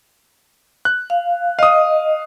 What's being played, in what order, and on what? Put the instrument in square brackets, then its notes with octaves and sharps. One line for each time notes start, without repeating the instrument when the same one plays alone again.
[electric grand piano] F#6
[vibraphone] F5
[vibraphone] D#5 [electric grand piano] F5 D#6